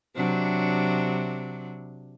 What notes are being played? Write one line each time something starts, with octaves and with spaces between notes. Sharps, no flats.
C3 F#3 D4